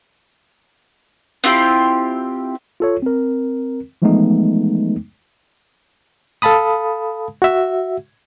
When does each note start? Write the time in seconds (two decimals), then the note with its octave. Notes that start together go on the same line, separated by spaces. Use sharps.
1.44 C4 E4 F4 G4
2.80 F4 A4 C#5
3.02 C4 A#4
4.02 E3 F3 G#3 A3 B3 D#4
6.42 A4 F5 A5 B5 D#6
7.42 F#4 E5